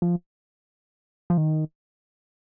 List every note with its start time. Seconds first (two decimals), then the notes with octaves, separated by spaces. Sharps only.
0.02 F3
1.30 F3
1.37 D#3